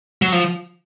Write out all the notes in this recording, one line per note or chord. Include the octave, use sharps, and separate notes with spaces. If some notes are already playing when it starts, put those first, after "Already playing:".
F#3
F3